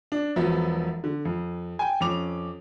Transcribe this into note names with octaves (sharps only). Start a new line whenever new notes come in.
D4
E1 F3 F#3 B3 E5
D3
F2
G5 G#5
F2 C#4 D6 F7